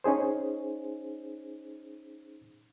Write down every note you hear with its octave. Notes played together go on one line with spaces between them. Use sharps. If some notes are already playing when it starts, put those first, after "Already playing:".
C#4 D#4 G#4 C5